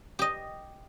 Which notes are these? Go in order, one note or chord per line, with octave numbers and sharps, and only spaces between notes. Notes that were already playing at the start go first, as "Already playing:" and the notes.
G4 D#5